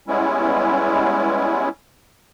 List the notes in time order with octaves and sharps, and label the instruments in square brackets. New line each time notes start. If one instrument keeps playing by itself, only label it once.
[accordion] G3 G#3 B3 C#4 E4